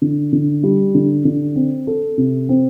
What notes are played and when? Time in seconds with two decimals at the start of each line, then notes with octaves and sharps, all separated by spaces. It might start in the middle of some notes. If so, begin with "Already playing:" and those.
0.02 D3
0.33 D3
0.63 G3
0.95 D3
1.25 D3
1.56 C4
1.87 A4
2.18 C3
2.49 C4